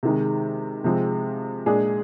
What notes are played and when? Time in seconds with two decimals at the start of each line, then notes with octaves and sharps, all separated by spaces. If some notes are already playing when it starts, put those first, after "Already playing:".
0.03 C3 D#3 G#3
0.84 C3 F3 G#3 C4
1.66 A#2 G#3 D4 G#4